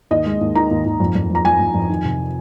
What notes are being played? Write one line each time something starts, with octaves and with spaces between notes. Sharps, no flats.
D#2 D#5
G#3
D#2
D#3 A#5
D#2
D#2
F2
F2
F3 A#5
F3 G#5
F2
F2
D#3
C3